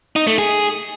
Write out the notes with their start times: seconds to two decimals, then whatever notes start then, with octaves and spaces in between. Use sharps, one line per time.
0.16 D#4
0.27 A3
0.39 G#4